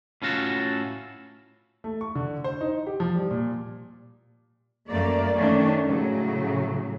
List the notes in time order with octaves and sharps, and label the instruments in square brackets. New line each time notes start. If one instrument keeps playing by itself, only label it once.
[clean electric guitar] A2 C#4 F4 F#4 A4
[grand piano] A3
C#6
D3
C5
D#4
G4
F3
G3
A#2
[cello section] F#2 A3 A#3 D5
D#3 A3 C#4 D4
A2 C#3 F#3